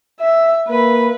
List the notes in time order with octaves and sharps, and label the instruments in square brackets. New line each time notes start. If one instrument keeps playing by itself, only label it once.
[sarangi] E5
[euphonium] A#3 [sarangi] B4